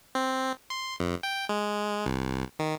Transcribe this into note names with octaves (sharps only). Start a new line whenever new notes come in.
C4
C6
F2
G5
G#3
C2
D#3